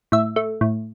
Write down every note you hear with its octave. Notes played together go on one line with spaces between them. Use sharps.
A2 E5
A3
A2